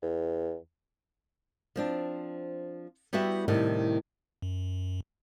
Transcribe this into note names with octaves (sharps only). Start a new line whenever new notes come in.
E2
F3 C4 D4
G3 B3 E4 F#4 G4 E5
A2 C3 D#3 G3
F#2